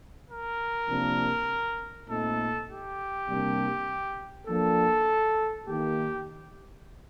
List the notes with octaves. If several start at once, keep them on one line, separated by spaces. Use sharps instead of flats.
A#4
C3 F3 A#3 D4
A#2 A3 C4 D#4 A4
G4
C3 G3 A#3 D4
F3 A#3 D4 A4
D#3 A#3 D#4 G4